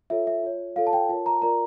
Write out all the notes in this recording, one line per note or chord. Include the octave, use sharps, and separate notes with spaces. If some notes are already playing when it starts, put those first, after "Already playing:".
F4 A4 C#5 E5
E5
F4 C#5
F4 A4 C#5 F5
A5
G5
F4 A#4 C#5 A5
A#5
F4 A#4 D5 A#5